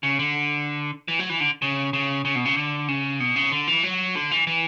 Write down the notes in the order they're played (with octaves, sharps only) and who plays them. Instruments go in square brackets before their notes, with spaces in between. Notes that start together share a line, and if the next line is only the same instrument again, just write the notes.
[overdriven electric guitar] C#3
D3
E3
F#3
E3
D3
C#3
C#3
C#3
B2
C#3
D3
C#3
B2
C#3
D3
E3
F#3
D3
E3
E3